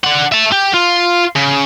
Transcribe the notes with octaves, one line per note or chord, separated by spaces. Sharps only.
D4 F#5
E5 A5
G4
F4
C#3